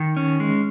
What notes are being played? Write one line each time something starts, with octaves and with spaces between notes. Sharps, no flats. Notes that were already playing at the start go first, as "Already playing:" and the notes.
Already playing: D#3
C#4
G#3